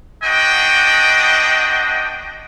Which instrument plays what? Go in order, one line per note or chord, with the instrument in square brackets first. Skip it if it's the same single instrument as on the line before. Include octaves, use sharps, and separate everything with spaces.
[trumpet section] B3 D4 F#4 D#5 G5